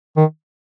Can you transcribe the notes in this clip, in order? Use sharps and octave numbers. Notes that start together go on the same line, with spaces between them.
D#3